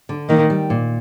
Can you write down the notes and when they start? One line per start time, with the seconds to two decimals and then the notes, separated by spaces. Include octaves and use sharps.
0.09 D3
0.29 D#3 A#3
0.50 G3
0.70 A#2